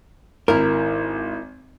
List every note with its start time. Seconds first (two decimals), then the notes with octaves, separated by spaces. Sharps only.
0.48 G#1 E4 A#4